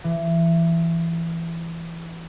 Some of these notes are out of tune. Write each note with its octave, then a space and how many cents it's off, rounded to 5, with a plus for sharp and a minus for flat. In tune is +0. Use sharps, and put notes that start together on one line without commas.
E3 +20